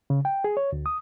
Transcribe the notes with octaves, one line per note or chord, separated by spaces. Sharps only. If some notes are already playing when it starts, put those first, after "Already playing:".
C#3
G5
G#4
C#5
D2
D#6